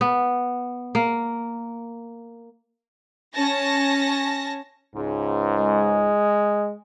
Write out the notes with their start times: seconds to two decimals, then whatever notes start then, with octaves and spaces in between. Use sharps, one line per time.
0.01 B3
0.95 A#3
3.35 C#4 A5 A#6
4.95 C#2 G#2
5.59 G#3